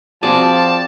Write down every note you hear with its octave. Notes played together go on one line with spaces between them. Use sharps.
F3 C4 F#4 G#4 D5 A5